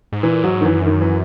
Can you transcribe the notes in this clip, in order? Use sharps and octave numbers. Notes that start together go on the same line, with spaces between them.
G#2
A#2 E3
G#2 F#3
D#3
F#2 E3
E3
D#3
E3